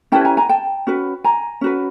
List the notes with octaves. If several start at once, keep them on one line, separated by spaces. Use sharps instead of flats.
C#4 E4 G4 B4 G5 A5
G#5 A#5
G#5 A#5
G5 A5
C#4 F#4 B4
G#5 A#5
C#4 F#4 B4